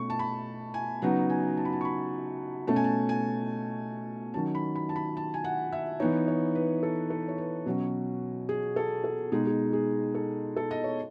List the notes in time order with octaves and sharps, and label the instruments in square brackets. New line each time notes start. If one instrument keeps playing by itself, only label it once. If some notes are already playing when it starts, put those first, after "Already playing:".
Already playing: [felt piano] B2 A3 C#4 C#6
A5
B5
G#5
C#3 F#3 B3 D#4 F#5
G#5
A5
B5
A5
C#6
B5
B2 A3 C#4 A5
G#5
A5
G#5
D#3 F#3 C#4 A5
B5
B5
A5
B5
A5
G#5
F#5
E5
E3 B3 D#4 C#5
C#5
B4
A4
A4
C#5
B4
B2 F#3 C#4
G#4
A4
A4
B2 G#3 D#4 G#4
G#4
G#4
A4
A4
D#5
C#5